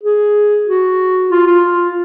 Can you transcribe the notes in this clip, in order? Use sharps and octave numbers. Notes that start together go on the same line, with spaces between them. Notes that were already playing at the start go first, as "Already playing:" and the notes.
G#4
F#4
F4
F4